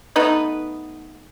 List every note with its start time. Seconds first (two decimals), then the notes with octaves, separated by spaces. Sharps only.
0.16 A3 B3 D#4 B4